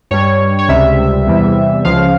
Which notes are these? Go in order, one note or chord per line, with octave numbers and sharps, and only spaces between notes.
G2 G3 C#5
C#5
C#2 C3 G3 E5
E2 C3 E3 G3
C#2 C#3 F3 F5